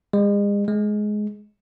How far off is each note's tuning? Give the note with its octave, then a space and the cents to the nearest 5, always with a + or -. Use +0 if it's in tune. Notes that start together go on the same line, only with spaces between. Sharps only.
G#3 -40
G#3 +15